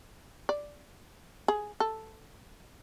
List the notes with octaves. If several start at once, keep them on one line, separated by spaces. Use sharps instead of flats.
D5
G#4
A4